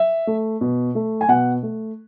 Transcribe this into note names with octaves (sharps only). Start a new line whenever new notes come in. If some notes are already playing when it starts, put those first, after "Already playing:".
Already playing: E5
A3
B2
A3
G#5
B2 F#5
A3